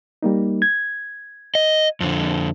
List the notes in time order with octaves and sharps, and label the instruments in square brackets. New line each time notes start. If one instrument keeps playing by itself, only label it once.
[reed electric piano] G3 A#3 D#4
G#6
[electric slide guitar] D#5
F2 D3